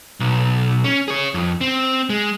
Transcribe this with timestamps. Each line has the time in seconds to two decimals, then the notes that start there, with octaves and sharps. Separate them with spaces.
0.20 B1
0.84 C#4
1.08 G#4 C#5
1.34 F2
1.61 C4
2.10 G#3